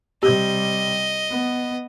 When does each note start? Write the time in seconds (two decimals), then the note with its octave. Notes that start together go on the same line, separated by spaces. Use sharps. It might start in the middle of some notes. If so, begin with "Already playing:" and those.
0.23 C3 G3 G4 D#5
1.30 B3